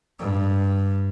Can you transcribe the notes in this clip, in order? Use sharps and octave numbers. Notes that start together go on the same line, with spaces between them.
G2